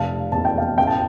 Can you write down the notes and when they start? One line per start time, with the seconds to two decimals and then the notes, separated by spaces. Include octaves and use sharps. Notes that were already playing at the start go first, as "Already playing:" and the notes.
Already playing: F1 F5 A5
0.32 E2 A5
0.45 G5
0.57 F5 A5
0.78 A1 G5
0.87 A5